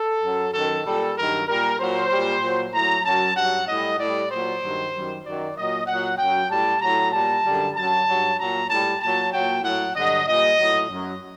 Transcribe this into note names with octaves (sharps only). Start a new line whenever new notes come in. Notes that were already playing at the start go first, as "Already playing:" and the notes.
Already playing: A4
F#2 F#3
F#2 D#3 F#3 A4
A#2 G3 A4
G2 D#3 F#3 A#4
A#2 G3 A#4
A#2 F#3 C5
A#2 G3
A#2 F#3
A2 F#3 A#5
F#2 F#3 A5
G2 F#3 F#5
A2 G3 D#5
A2 G3 D5
A#2 F#3 C5
G2 D#3 F#3
F#2 D#3 G3
F#2 D#3 F#3 D5
A#2 F#3 D#5
A#2 F#3 F#5
F#2 F#3 G5
A2 G3 A5
A2 F#3 A#5
A#2 G3 A5
F#2 D3 G3
F#2 F#3 A5
G2 F#3
A#2 F#3 A#5
A2 G3 A5
A#2 F#3 A5
A#2 F#3 G5
A2 F#3 F#5
G2 D3 F#3 D#5
A#2 G3 D#5
A2 F#3
F#2 F#3